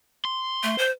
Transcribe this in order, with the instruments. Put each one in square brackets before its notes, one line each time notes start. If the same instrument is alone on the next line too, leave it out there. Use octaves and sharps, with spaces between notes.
[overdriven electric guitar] C6
[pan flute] A3
C5